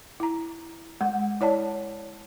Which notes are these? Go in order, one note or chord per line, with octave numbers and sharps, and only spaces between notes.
E4 A#5
G#3 F#5
E4 C#5 D5 A5